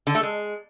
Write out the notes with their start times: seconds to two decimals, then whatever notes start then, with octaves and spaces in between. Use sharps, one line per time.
0.07 D3
0.15 A3
0.23 G#3